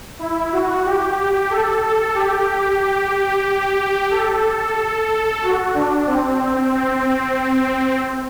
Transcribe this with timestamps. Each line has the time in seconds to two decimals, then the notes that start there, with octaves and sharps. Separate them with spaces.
0.19 E4
0.52 F#4
0.85 G4
1.50 A4
1.83 A4
2.15 G4
2.81 G4
4.11 A4
5.42 F#4
5.74 D4
6.07 C4
6.72 C4